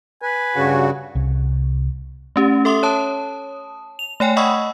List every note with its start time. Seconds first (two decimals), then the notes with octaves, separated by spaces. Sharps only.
0.23 B4 G#5
0.55 G2 C#3 F#4
1.15 C2
2.36 A3 C#4 G4
2.65 A4 E5 C6 D#6
2.83 C#5 A5 D#6
3.99 F7
4.20 A3 C#5 G5 G#5
4.37 D#5 F#5 B5 C#6 D#6 E6